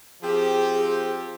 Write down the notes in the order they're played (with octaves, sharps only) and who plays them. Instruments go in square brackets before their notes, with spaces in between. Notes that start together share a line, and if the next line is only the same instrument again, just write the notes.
[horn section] F3 C4 G4 [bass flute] G#4